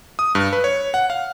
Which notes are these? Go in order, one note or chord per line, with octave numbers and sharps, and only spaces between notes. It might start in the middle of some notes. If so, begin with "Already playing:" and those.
D#6
G2
B4
C#5
F#5
F5